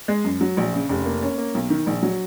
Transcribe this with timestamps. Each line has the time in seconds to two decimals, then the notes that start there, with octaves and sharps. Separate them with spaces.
0.08 G#3
0.24 F#2
0.41 F#3
0.57 A#1
0.73 C#3
0.89 F1
1.05 A#3
1.23 C#4
1.38 A#3
1.54 B1
1.70 D#3
1.86 A#1
2.03 F#3